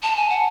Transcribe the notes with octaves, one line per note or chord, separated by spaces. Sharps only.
A5
G#5
F#5